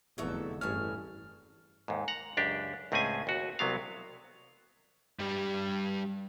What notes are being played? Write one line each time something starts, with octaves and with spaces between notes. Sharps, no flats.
F1 E2 D3 F#3 A4 E5
A1 G2 C#4 G#4 A5 F6
D#2 G#2
F#5 A#5
C#2 F#2 D4 G4
C#2 A2 C4 C#4 G#4 G#5
D#2 F#4
C2 C3 F#3 B3 F5
G2 G3